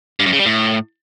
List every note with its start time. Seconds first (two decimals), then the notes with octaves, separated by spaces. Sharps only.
0.20 G2
0.26 F#2
0.33 C#3
0.39 G3
0.46 A2